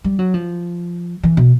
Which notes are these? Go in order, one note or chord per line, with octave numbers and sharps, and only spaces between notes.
G3
F#3
F3
E3
B2